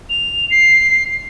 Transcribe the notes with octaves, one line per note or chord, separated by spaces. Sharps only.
F7
C7